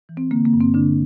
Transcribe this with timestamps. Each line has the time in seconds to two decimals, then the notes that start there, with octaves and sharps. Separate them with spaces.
0.09 E3
0.17 C4
0.31 D3 A#3
0.45 A#3
0.53 G2
0.60 C4
0.74 D3 D4